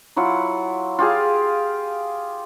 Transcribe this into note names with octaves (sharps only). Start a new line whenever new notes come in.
F#3 E4 F4 F#5
F4 G4 G#4 F5